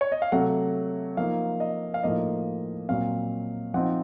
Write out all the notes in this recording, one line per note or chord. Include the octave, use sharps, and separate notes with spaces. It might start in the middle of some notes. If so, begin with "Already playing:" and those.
C#5
D#5
F5
C3 F#3 A3 F#5
F3 A#3 D#4 F5
D#5
F5
A2 F3 A#3 D#4 D#5
A#2 F#3 C4 F5
F3 C4 D#4 F#5